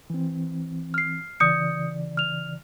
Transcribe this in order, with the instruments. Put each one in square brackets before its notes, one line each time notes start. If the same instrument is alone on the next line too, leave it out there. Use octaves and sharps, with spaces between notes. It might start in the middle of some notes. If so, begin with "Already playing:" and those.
[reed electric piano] E3 C4
[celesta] F6 C7
[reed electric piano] C#3 E3 D5 [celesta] D#6 G6 C#7
[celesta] F6 F7